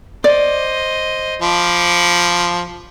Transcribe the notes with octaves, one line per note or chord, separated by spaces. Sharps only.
C5 D5 D#5
F3 B5 D6